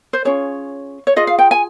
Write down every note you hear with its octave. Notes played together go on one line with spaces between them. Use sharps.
C5
C#4 F4 G#4 C#5
C#5
F4 G#4 D#5
F5
G5
G#5